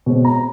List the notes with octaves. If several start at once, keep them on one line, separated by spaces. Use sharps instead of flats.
B2 G#3 C4
A#5